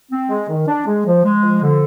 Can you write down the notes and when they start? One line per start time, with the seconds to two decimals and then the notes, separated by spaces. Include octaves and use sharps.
0.12 C4
0.29 G#3
0.49 D#3
0.67 D4
0.86 G#3
1.06 F3
1.24 G#3
1.42 F3
1.61 D3